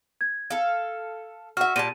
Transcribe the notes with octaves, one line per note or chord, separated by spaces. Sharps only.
G#6
A4 F5
F#4 E5 F#5 F6
A#2 G3 A5 D#7